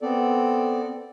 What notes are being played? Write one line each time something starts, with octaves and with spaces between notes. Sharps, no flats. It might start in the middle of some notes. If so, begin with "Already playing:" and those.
B3 C4 A4 D5